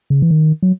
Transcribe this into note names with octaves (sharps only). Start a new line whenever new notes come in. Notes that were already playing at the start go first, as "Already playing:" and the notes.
C#3
E3
D#3
F#3